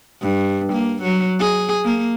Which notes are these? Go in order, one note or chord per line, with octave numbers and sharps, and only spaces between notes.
G2
A#3
F#3
G#4
A#3